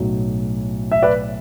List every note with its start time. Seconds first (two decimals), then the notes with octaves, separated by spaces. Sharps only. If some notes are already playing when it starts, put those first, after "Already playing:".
Already playing: B1 A2 F#3
0.92 E5
1.03 B4 D5